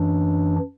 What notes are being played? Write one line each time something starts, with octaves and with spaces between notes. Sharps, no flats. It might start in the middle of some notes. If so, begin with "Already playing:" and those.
Already playing: F#2 E3 D4